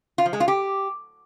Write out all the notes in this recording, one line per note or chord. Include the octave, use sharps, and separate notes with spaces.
F4
F3
G#3
F4
G4